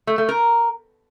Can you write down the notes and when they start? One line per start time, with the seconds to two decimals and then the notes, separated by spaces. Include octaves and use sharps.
0.07 A3
0.18 A3
0.29 A#4